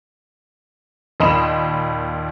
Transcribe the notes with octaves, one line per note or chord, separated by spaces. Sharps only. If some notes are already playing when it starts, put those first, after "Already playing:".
D#2 A#2 D#5 B5 C6 E7